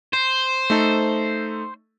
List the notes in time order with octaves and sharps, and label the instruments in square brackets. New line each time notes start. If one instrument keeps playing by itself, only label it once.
[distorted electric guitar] C5
[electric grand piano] A3 D#4 A4